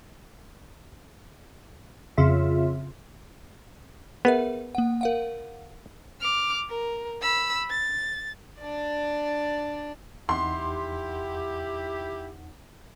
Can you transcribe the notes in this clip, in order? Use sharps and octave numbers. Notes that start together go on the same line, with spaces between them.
F2 C#3 F4 E5
B3 G#4 A#4 E5
A#3 F#5
A#4 F5 F#5
D6 F6
A#4
B5 E6
A6
D4 D5
E2 D#4 E4 G4 F#5 C6